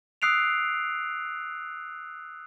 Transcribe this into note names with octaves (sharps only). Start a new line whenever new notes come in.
D#6 E6 F#6 C7 D7 F7